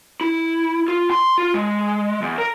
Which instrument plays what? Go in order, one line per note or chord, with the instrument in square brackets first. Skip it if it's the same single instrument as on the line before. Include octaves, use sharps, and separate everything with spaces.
[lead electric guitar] E4
F4
C6
F4
G#3
E2
A#4